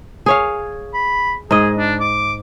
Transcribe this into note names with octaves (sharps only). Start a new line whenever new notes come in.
G#4 C#5 F5
B5
G#2 G#4 D#5
D4
D6